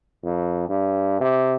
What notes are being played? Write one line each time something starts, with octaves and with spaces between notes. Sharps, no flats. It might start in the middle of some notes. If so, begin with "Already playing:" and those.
F2
G2
C3